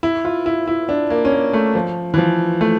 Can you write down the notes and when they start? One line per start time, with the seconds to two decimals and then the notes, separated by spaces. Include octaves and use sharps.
0.03 E4
0.25 F4
0.46 E4
0.67 E4
0.89 D4
1.10 A#3
1.25 C#4
1.32 A#3
1.53 A3
1.75 F3
2.14 E3
2.18 F3
2.61 A3